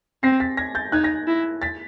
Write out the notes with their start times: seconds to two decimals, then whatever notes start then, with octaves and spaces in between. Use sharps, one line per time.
0.23 C4 A#6 C7
0.40 A6 B6
0.57 G#6 A#6
0.75 G6 A6
0.92 D#4 F#6 G#6
1.04 G#6 A#6
1.28 E4
1.62 A6 B6